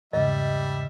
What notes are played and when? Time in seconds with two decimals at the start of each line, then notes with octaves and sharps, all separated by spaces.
0.13 E2 G#2 C#3 G3 D#5 E5